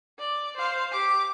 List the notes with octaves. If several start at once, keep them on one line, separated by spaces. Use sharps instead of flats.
D5
C5 F5
G4 D6